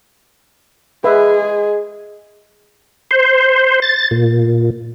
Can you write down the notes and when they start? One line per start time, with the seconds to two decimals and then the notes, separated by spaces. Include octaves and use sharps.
1.04 G#3 G#4 B4 E5
3.11 C5
3.82 A6
4.11 A#2